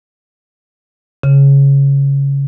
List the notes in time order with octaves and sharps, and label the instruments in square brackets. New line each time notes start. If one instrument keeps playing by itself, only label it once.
[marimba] C#3